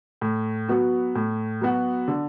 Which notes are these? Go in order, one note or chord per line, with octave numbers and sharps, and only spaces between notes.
A2
F#3 B3 F#4
A2
F#3 B3 F#4
D3